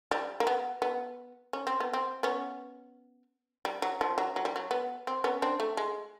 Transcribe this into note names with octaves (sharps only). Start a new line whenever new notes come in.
G3
A#3
B3
B3
C#4
C4
B3
C4
B3 C#4
G3
F#3
F3
F#3
F#3
G3
F#3
B3
C4
B3 C#4
C4 D4
A3
G#3